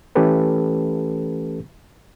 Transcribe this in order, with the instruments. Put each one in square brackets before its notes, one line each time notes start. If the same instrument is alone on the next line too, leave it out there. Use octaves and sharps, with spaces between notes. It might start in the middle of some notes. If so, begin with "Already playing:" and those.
[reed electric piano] E3 A3 C#4 G4 A4 B4